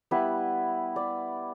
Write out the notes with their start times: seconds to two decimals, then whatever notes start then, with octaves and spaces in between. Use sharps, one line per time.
0.11 G3 B3 E4 B4
0.96 D5